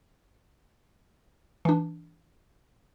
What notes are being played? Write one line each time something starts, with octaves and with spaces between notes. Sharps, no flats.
E3 D4